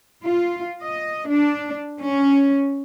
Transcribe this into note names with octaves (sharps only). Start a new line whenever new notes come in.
F4
D#5
D4
C#4